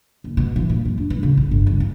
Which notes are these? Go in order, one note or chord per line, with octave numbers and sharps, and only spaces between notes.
F#1
B2
E3
A#2
F#2
D4
E3
C#3
B1
G1
C#2
D#3